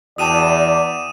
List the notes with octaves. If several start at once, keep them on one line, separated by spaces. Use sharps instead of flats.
E2 F#4 D5 G5 A5 D#6 D#7 E7